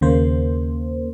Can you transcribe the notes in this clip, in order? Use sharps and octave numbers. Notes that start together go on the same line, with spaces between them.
D#2 C#3 A#3 C5